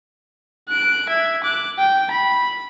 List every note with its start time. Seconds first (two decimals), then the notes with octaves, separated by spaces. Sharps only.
0.69 F#6 D7
1.09 E5 G#6
1.43 D6 F#6
1.78 G5
2.11 B5